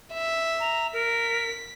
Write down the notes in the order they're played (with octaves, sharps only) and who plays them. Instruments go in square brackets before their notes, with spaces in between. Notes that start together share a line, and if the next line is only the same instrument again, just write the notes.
[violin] E5
[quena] A#5
[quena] A#4 [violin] B6